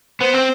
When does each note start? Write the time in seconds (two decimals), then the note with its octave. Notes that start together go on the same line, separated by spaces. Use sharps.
0.20 B3 C5
0.34 C4